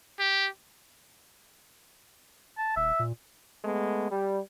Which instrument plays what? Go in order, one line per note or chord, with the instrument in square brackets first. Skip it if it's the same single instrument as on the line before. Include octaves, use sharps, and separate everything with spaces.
[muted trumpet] G4
[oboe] A5
[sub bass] D#1 [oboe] E5
[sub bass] A#2
[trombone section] G#3 A3 B3
G3